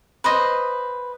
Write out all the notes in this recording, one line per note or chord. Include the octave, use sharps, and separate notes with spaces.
B4 C5 D#5